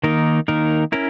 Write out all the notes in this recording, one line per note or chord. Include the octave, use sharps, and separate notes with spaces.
D#3 A#3 D#4 A#4
D#3 A#3 D#4 A#4
C#4 E4 A#4